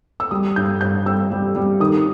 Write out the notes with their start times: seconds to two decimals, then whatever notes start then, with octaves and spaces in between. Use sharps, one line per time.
0.20 E6
0.31 G3 D#6
0.56 G2 G6
0.81 G2 G6
1.06 G3 E6
1.31 G3
1.56 G3
1.80 D#3 D#6